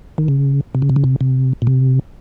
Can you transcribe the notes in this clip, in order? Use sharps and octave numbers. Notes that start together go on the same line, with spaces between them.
D#3
C#3
C3
C#3
C3
C#3
C3
C3
A#2
C3